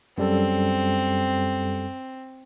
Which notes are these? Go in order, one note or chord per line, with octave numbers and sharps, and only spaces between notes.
F#2 G3 C4 A4